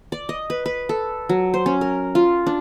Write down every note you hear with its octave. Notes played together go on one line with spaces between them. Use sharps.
D5
D#5
B4
B4
A4
F#3
C5
C#4
A#4
F4
D4